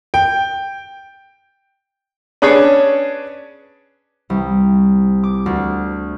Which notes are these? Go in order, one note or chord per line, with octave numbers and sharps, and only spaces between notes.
G5
C#4 D4 G#4 B4 C#5
C2
D6
D2